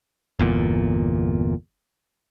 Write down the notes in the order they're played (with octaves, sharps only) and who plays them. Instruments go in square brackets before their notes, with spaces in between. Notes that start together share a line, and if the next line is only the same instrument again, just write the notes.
[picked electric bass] G1 E2 A#2